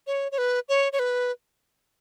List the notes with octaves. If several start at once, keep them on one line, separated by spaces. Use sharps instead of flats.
C#5
C#5
B4
C#5
C#5
B4